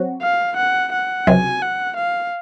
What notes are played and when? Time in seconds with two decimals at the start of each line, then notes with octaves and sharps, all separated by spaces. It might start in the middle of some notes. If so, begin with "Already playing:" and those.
Already playing: F#3 C4 F#4
0.22 F5
0.57 F#5
0.93 F#5
1.27 C#2 C3 F#3 G#5
1.62 F#5
1.97 F5